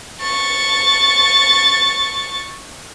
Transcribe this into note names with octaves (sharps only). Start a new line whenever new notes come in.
C#6 A6